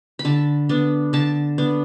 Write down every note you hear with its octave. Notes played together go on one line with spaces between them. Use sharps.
B5
D3 A5
B3 D4
D3 A5
B3 D4